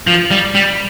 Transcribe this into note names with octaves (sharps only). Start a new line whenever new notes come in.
F3
G3
G3